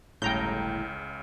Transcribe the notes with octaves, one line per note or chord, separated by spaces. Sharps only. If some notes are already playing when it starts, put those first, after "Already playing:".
G1 C#2 A2 C#3 G5 A#5 G6